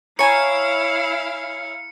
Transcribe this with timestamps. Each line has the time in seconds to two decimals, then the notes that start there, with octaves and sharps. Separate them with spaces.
0.19 E4 C#5 F5 G#5 A#5 C#7